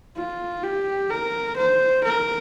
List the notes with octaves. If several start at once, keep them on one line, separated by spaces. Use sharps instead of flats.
F4
G4
A#4
C5
A#4